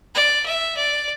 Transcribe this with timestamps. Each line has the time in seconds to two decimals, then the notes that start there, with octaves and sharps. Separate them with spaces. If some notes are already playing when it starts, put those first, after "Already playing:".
0.15 D5
0.45 E5
0.77 D5